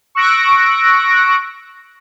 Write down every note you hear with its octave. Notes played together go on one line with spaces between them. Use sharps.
C#6 E6 F#6 A#6 D7